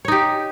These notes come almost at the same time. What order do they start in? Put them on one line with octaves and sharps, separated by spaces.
C#5 D#4 G4